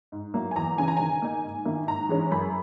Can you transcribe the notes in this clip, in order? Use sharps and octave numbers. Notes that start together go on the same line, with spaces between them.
G#2
F#3 A#3 E4
G#5
E2 A#5
C#3 E3 G#5
A#5
D#3 G#5
A#3 D#4
G#2
D#3 A#3 E4
G#2 A#5
E3 G#3 C#4
F#2 B5